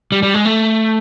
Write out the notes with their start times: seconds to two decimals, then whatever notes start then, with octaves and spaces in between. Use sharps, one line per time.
0.12 G3
0.23 G3
0.34 G#3
0.45 A3